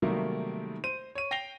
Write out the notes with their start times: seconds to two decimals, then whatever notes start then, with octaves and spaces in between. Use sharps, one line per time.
0.02 C3 D#3 F#3 G3 A3 A#3
0.84 C5 D#7
1.15 C#5 D#7
1.31 G5 A#6 C7 F7 G7